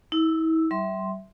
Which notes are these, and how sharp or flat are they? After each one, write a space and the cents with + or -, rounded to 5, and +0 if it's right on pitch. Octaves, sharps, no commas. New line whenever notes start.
E4 -40 E6 +0
G3 -40 E5 +0 C6 +0